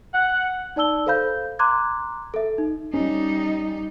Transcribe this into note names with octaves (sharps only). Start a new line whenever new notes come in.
F#5
D#4 D5 A5 E6 G7
A4 C5 F5 B5 G6
A#5 C6 D6 F#6 G#6
A4 E5
D#4
G3 C#4 D#4